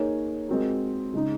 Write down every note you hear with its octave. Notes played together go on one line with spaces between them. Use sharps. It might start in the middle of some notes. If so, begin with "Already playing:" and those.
Already playing: A#3 D#4 G#4 C#5
G#3 C4 F#4 A#4
C#3 G#3 D#4